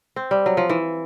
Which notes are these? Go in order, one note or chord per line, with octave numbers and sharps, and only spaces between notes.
C4
G3
F#3
F3
E3